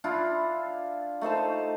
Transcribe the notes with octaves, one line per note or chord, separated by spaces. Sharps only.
D4 E4 F4
A3 D#4 C5 A5